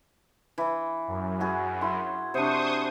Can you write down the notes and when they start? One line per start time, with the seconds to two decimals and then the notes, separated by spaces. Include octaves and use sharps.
0.58 E3 E4
1.08 F#2
1.40 E4 F#4 G#4
1.81 E4 C6
2.34 C3 D4 C5 C#6 D#6